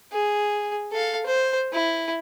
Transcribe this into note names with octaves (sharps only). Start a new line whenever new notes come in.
G#4
A4 F5
C5
E4